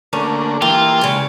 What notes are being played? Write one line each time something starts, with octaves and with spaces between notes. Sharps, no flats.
D3 A3 A#3 C#4
E3 A#3 F4 G4
E2 C#3 G#3